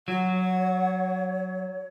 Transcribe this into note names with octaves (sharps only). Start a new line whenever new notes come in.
F#3 C#5 F#5